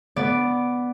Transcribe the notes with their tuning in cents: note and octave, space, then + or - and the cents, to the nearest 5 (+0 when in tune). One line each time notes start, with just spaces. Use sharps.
B3 +0 D5 +0